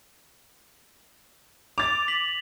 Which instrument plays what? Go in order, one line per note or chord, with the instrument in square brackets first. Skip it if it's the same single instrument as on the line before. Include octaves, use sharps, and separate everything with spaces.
[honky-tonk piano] D6 A6 [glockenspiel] F7
[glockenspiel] B6 F#7